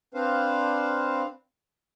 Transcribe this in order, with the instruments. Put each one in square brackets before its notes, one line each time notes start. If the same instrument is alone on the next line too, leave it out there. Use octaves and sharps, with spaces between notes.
[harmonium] C4 D4 B4 C5 F5